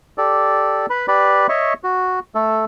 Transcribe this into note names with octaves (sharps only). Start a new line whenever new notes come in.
G4 A4 D5
B4 B5
G4 B4 D5 B5
C#5 D#5 E5 C#6
F#4
A3 A4